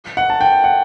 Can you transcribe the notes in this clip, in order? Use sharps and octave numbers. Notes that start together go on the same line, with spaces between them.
F#5
A5
G5
F#5